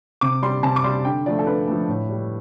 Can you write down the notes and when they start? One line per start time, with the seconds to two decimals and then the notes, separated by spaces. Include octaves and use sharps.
0.21 C3 D6
0.42 G3 C6
0.63 C3 A5
0.76 D6
0.84 G3 C6
1.05 D3 G5
1.26 F3 A3 D5
1.39 A4
1.47 D3 B4
1.68 F3 A3
1.89 A2
2.09 G3